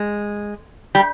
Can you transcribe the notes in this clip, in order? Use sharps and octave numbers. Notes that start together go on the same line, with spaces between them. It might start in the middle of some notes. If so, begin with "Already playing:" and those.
Already playing: G#3
G3